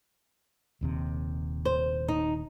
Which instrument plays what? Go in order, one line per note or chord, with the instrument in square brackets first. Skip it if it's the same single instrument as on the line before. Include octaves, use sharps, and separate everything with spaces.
[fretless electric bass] D#1 D#2 C3
[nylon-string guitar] C5
D#4